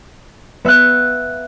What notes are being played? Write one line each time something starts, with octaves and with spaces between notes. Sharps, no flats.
B3 E5 F5 F#6